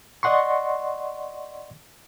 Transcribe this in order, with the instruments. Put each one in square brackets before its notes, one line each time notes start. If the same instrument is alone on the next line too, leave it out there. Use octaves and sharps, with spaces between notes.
[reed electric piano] D5 D#5 F#5 C6 C#6